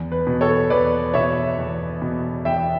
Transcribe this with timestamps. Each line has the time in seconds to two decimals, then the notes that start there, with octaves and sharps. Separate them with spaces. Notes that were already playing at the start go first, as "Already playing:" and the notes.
Already playing: E2
0.12 B4
0.27 B2
0.41 A4 C#5
0.70 E2 B4 D5
1.14 B2 C#5 E5
1.58 E2
2.02 B2
2.45 E2 E5 G5